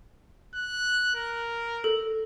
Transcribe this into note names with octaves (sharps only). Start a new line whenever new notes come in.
F#6
A#4
A4